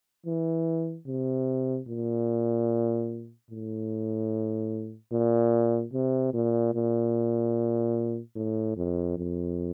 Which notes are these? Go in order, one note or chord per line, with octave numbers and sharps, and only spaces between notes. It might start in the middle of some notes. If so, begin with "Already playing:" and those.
E3
C3
A#2
A2
A#2
C3
A#2
A#2
A2
F2
F2